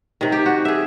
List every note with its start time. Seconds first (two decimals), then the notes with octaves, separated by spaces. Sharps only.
0.21 C3 D#3
0.32 G4
0.46 F#4
0.65 G#4 E5